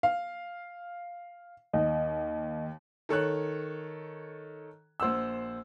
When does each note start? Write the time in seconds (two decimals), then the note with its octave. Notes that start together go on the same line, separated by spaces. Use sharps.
0.03 F5
1.73 D#2 D#5
3.09 D#3 A4 C#5 F#6
5.00 A#1 C5 F#5 E6